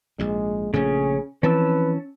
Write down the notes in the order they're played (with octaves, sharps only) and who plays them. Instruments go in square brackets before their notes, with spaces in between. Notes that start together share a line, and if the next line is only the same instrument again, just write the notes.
[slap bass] A#1 G#2 [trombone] G#3
[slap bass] A#1 F3 A3 [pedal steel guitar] C#3 C#4 [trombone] G#4
[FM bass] E3 [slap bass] F3 C4 [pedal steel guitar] C#4 A5 E6 [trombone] B4